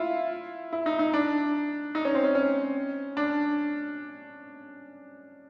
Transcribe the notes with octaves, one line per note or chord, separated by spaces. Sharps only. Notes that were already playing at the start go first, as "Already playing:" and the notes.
Already playing: E4 F4
E4
D#4
D#4
D4
D#4
C#4
C4
C#4
C#4
D4